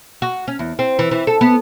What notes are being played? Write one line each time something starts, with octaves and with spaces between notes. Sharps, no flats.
F#4
C#4
E2
C4
E3
E3
A4
B3